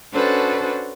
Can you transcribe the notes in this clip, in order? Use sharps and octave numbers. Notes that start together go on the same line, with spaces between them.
C#4 D4 F#4 A4 B4 C5